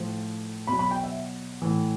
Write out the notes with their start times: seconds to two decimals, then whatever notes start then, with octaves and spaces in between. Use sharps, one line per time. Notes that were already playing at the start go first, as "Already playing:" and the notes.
Already playing: A2 F3
0.67 B2 F#3 B5
0.79 B5
0.91 G5
1.04 E5
1.62 A2 E3